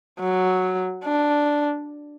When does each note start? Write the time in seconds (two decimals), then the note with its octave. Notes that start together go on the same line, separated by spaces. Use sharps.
0.20 F#3
1.05 D4